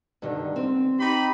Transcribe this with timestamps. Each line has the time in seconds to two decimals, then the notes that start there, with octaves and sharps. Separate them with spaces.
0.22 G2 D3 D#3
0.56 C4
1.00 D#4 G4 B5